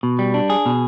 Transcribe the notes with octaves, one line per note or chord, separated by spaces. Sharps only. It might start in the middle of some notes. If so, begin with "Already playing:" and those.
B2
G3
D4
G#4
B2